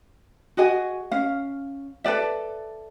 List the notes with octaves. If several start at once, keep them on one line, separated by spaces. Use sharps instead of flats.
F#4 G#4 D#5 G#5
C#4 F5
A4 B4 D5 E5